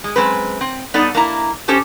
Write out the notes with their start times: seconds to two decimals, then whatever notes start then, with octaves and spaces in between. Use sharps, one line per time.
0.04 G#3
0.16 F#2 G#3 C4 B4
0.61 C4
0.94 G3 B3 D#4 A4 D5
1.15 A#3 D4 E4 A#5
1.68 C#4 G4 A4 C5 C#5